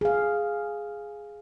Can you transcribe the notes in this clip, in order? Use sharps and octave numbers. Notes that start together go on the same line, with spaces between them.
G#4 F5